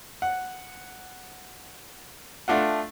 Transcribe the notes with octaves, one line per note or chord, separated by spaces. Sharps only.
F#5
A3 D4 F4 F#5